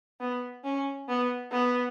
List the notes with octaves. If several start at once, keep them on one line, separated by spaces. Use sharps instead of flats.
B3
C#4
B3
B3